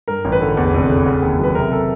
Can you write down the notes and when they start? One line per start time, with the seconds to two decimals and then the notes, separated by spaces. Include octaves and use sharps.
0.08 G2 A#4
0.25 A1
0.32 B4
0.41 D3
0.57 E2
0.74 F1
0.90 C#3
1.06 C#3
1.22 D#2
1.39 F#3 B4
1.55 C3 A#4
1.72 A4